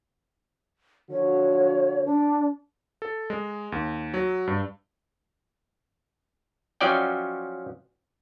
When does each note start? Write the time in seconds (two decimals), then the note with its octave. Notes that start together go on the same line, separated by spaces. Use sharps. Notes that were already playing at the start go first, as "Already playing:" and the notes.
1.11 D3 F3 F#4 C#5
2.05 D4
3.02 A4
3.30 G#3
3.72 D#2
4.14 F#3
4.47 G2
6.81 F3 F#3 C#4 D5 D#5 G5